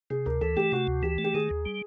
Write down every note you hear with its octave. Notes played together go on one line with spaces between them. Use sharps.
C3 G#4
D2 A#4
E3 A4
A3 G4
C3 F#4
D2
E3 G4
A3
G4
D#3 G#4
D#2
G3